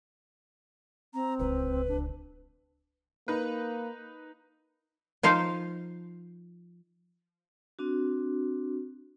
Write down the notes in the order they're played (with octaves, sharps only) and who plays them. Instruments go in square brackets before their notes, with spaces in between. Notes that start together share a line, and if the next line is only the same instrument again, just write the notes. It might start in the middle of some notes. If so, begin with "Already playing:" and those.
[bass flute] C4 [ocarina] A#5
[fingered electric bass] D1 C#2 [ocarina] B4
[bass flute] D4
[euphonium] A#3 [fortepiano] D#4 B4
[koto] F3 D#4 C5 F5
[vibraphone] C4 D4 F#4